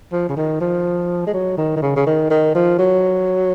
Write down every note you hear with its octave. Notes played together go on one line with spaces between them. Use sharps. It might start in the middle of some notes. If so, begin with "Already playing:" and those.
F3
C#3
D#3
F3
G#3
F#3
D#3
D#3
C#3
C#3
D#3
D#3
F3
F#3